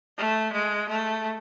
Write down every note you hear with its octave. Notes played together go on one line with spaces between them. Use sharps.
A3
G#3
A3